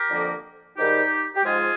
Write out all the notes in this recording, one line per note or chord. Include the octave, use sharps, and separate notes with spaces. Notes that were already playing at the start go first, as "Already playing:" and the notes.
Already playing: G4 A#4
F2 D3 F3 A#3
G#2 D#3 G3 D#4 G4
G4
G#2 F3 G#3 F4 G#4